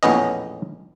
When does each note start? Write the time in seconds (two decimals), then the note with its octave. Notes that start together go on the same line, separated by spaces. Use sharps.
0.03 A#1 E2 A2 B3 C#4 D#5